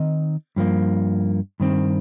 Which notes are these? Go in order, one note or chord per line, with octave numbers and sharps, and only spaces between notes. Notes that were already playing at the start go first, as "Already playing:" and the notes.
Already playing: D#3 C4 D#4 D#5
G2 F3 A#3
G2 D#3 C4